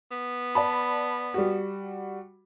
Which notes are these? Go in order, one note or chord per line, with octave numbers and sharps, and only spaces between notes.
B3
D5 A5 B5
G3 F#4